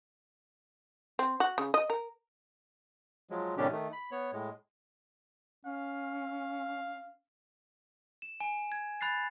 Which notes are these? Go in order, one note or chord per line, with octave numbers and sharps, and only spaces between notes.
C4
F#4
C#3
D#5
A#4
F3 F#3 G#3
A2 C3 D#3 C#4 D4 G4
D#3 A3
B5
B3 C#5
A2 G#3
C#4 F5
E7
G#5
G#6
B5 F#6 A6 C7